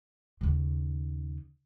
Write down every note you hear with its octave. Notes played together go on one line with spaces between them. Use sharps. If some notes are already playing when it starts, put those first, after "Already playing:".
D#2 C#3